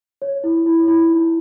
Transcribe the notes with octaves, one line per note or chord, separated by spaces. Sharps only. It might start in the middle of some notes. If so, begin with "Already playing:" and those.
C#5
E4
E4
E4
D#4